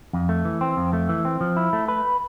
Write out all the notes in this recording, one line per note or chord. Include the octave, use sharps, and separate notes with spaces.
F2
A3
E3
C4
F2
A3
E3
C4
F3
E4
A3
B4